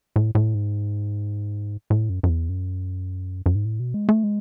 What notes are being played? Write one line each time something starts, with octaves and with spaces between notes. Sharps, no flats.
A2
A2
G#2
A2
F#2
F#2
E2
F#2
F#2
G#2
A2
B2
G#3
A3
G#3